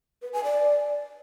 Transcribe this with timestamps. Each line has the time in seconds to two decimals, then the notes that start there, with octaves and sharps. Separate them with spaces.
0.22 B4
0.33 G#5
0.44 D5